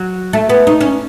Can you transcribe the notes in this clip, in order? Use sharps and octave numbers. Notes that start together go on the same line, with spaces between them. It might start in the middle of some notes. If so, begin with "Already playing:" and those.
Already playing: F#3
A3
B3
D#4
C#4